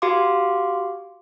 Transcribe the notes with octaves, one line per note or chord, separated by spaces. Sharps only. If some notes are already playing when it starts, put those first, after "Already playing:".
F#4 G4 F5 C6 D6